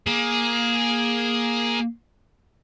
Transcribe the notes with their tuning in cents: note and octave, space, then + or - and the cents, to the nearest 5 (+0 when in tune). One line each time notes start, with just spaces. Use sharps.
A#3 +15 G#4 +0